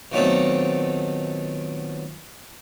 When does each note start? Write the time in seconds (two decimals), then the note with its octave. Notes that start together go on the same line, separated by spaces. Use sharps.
0.12 A#2 D#3 F#3 A3 B3 C4